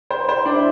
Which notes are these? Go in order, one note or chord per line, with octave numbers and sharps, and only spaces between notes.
C5
C5
D4
E4